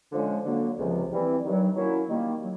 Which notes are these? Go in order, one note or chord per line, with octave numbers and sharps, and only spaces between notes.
D3 F3 G#3 C#4
D3 F#3 A#3
C#2 C3 F3
E3 G3 C4 E4
G2 D#3 F#3
F#3 A#3 C#4 E4
D#3 G3 A#3
F#3